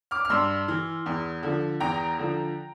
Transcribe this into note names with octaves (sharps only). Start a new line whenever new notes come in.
D6 F6
F6
G2 C6 E6
E3
E2
D3 F3
E2 G5 A#5
D3 F3